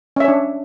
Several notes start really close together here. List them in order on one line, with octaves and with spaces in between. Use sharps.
C#4 E5 C#5 D4